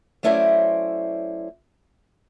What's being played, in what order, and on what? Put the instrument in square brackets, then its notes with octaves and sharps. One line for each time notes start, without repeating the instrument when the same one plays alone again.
[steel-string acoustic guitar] F#3 A3 C#4 E4 C5 D5